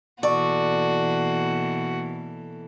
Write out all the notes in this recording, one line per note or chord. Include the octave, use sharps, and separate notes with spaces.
B2 E3 A#3 F#4 A4 D5 C#6